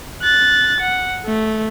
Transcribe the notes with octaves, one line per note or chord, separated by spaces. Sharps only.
F#6 A6
F#5
A3